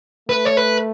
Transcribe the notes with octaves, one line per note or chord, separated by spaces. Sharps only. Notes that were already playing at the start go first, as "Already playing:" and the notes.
A3 B4
C#5
B4